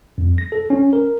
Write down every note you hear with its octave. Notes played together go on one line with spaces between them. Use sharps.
F2
A#6
A4
C#4
A#4